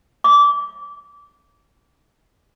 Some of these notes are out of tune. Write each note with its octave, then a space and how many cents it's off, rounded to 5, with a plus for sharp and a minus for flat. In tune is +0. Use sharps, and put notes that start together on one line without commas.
D6 -25